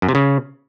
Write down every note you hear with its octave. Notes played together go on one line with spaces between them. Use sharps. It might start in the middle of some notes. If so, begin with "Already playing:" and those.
F#2
C3
C#3